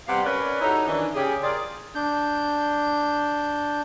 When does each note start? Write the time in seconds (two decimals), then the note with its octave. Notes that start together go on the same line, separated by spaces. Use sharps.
0.07 C3 G3 B3 G4 F5 F#5
0.25 C#4 A#4 B4 C#5 D5
0.61 D#4 E4 F#4 G4 A4 C#5
0.87 D#3 E3 C#4 D4
1.14 C#3 G4 G#4
1.43 F4 G#4 A#4 D5
1.95 D4 G6